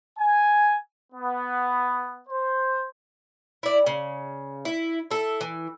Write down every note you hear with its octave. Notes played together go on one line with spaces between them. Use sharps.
G#5
B3
C5
E4 D5
C#3
E4
E4 A4
E3